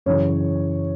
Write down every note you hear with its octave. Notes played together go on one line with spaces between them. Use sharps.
F#2 C#3 E3 C#5